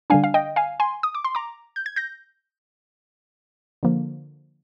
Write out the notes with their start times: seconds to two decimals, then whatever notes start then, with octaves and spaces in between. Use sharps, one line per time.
0.10 D3 G3 D4 F5 G#5
0.24 F5
0.34 D#5 G5
0.56 F5 G#5
0.80 G#5 C6
1.03 D#6
1.15 D6
1.24 C6
1.35 A#5 D6
1.76 G6
1.86 G#6
1.96 G6 A#6
3.83 D3 F3 A#3